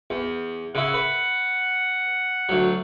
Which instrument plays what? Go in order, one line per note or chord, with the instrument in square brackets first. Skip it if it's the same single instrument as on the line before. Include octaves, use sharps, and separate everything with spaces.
[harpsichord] E2
[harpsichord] C#3 E4 [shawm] F#5
[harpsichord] B4
D2 F#3